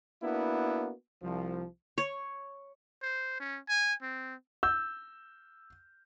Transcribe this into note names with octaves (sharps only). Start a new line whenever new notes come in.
A#3 B3 D4 E4 F#4
C2 F3
C#5
C5
C#4
G#5
C4
E6 G6